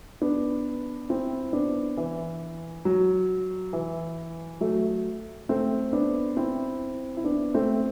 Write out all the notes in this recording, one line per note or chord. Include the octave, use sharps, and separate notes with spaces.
B3 D4
C4 E4
B3 D4
E3
F#3
E3
F#3 A3
A3 C4
B3 D4
C4 E4
E4
B3 D4
A3 C4